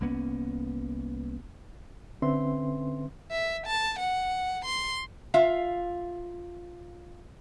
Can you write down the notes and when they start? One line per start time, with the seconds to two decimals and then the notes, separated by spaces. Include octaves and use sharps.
0.01 C2 A#3 B3 C#4
2.22 D3 C4 C#4 B4 E5 C6
3.31 E5
3.66 A5
3.99 F#5
4.65 C6
5.34 F4 E5 F5